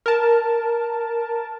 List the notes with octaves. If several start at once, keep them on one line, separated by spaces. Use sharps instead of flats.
A#4 A5